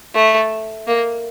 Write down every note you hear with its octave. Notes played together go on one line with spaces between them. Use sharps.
A3
A#3